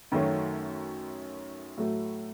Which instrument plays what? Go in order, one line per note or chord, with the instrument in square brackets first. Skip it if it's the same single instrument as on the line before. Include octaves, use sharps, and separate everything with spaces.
[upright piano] F#2 D#3 F#3 A3 C#4
A2 F#3 A3